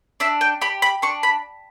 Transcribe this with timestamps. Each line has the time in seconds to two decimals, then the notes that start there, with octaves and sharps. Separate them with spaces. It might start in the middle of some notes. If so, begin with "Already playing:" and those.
0.20 D4 E5
0.41 G5
0.61 G4 B5
0.82 B5
1.02 D4 C#6
1.23 B5